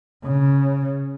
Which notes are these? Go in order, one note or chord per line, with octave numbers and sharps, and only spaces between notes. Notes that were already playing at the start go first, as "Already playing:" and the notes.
C#3